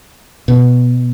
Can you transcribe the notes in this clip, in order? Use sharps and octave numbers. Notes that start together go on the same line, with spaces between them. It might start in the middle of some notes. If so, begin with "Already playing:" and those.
B2